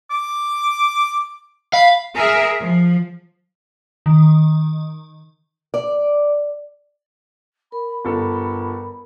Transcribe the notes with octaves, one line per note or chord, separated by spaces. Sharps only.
D6
F5 B5
G#4 A#4 E5
F3
D#3
D5
A#4 B5
G1 A4